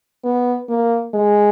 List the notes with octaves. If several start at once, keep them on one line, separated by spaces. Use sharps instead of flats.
B3
A#3
G#3